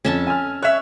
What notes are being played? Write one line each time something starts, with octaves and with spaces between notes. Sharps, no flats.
F2 C#4 E5 A5
G#5 F6
C#5 E5 F#6